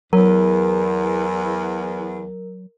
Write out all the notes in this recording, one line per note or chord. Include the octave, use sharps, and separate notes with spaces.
E2 F#3 A#4